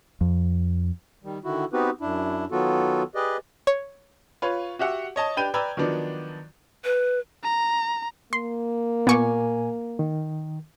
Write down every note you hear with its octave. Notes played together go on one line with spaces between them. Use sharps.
F2
D#3 G3
D3 D#3 E4 F#4
B3 C4 D#4 F#4 G4 B4
F#2 D4 E4
D#3 F#3 B3 F4 F#4 A4
G4 G#4 B4 D5 D#5
C#5
F4 B4 C#5
F#4 G4 E5 F#5
C#5 D#5 A5
D4 G4 B4 G5 G6 D#7
B4 D5 G5 A#5 E6 G#6
D#3 F3 F#3 B3 D4
B4
A#5
A#3 C6
A#2 B3 G#5 C#6 D6
D#3